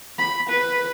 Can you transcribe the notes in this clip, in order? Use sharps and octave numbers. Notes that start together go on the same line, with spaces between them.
B5
B4